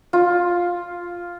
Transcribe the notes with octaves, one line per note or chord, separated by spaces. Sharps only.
F4